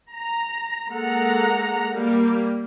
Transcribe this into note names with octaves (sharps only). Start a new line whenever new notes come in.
A#5
G#3 A#3 A4 F#5 A#5
G3 A#3